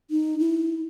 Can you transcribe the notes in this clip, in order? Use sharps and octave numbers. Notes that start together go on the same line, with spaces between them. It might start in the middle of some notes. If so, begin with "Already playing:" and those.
D#4
E4